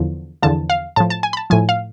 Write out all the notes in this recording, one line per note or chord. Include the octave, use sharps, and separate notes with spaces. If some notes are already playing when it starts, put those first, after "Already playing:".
Already playing: E2 D3 F3
E2 D3 F3 A5
F5
A2 F3 A5
A5
G#5
B5
A5
A2 F3 G#5
F5